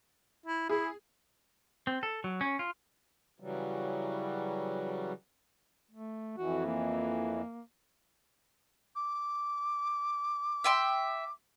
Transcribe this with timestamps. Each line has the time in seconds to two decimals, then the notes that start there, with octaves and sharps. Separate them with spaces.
0.46 E4
0.69 E4 G#4
1.87 C4
2.03 A4
2.24 F#3
2.41 C#4
2.59 F4
3.40 C#3 E3 F#3 G3
5.91 A3
6.37 F2 E3 F#4
6.65 A#3
8.95 D6
10.64 E5 G5 C6